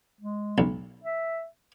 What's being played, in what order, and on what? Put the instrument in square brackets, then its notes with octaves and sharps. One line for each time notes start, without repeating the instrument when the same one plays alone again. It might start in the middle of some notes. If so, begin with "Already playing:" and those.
[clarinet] G#3
[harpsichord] B1
[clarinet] E5